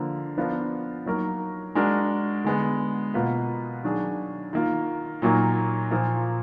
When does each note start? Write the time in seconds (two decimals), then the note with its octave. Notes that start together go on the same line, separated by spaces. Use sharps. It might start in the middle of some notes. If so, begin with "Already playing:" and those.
Already playing: D3 F3 A#3
0.38 F3 B3 D4 F4 A#4
1.06 F#3 A#3 D#4 A#4
1.75 G#3 D4 F#4 A#4
2.44 D3 G#3 B3
3.14 B2 A#3 F4 B4
3.83 D#3 F#3 D4 G#4
4.53 D#3 A#3 F4
5.22 A#2 F#3 A#3 D#4
5.91 A#2 F3 A#3